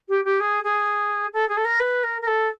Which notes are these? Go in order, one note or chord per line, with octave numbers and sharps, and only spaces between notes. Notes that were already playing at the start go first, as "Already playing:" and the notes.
G4
G4
G#4
G#4
A4
G#4
A4
A#4
B4
A#4
A#4
A4